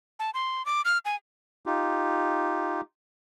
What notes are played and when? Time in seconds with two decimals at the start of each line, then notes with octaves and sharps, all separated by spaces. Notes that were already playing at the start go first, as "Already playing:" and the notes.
0.19 A5
0.34 C6
0.66 D6
0.85 F6
1.05 G#5
1.66 D#4 F4 G4